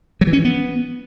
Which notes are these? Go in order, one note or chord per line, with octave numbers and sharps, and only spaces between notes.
F#3
E3
C#4
E3
B3